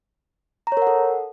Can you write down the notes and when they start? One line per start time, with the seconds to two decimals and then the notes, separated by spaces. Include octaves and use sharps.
0.67 A#5
0.72 C#5
0.77 A#4
0.82 F#5
0.87 A4